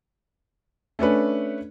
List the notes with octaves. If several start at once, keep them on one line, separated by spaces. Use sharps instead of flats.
A3 C#4 D4 B4